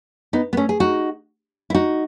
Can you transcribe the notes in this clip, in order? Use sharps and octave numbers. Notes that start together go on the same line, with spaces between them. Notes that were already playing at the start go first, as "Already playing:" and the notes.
B3 D#4
B3
A3 C#4
G#4
D#4 F#4
E4
D#4 F#4